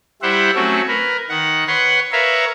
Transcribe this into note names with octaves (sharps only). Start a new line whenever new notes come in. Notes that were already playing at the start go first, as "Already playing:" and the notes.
G3 E4 G4 C5 E5 F#5
F#3 A3 C4 C#4 F#4
A#4 B4
D#3 F#5
B4 C#5 F#5 C6
A#4 B4 C#5 E5 F5